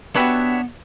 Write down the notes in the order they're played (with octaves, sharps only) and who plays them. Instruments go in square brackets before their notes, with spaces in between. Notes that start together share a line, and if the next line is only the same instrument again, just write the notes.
[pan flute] B3 [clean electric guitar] D4 C#5 E5 [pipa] F#4 G4 B4